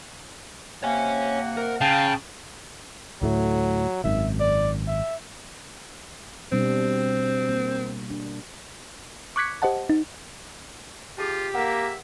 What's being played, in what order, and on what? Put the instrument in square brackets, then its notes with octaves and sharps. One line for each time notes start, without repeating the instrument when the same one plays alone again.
[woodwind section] C3 A#3 F#5 [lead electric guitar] C#5 G#5
[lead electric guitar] A#4
[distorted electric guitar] C#3 [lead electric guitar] F5 [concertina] G5 A5
[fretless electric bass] D2 A2 A3 [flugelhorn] F#3
[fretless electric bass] G#1 F#2 D#3 [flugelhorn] E5
[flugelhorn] D5
E5
[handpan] B2 G3 D4 [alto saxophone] C4
[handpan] A#3
D4
[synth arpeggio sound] C#6 D6 F#6 G#6 B6 C#7
G4 C5 D#5 F#5 A5
D#4
[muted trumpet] F4 [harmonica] G4 [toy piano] G#4 A5
[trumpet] A#3 [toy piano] A#4 F#5 [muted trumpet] E5